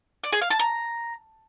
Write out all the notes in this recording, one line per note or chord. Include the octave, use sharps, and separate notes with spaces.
D5
G#4
F5
A5
A#5